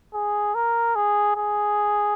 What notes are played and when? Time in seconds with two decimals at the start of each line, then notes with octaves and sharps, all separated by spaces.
0.14 G#4
0.55 A#4
0.95 G#4
1.36 G#4